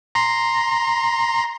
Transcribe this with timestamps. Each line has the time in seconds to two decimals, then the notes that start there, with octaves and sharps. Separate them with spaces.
0.15 A#5 C6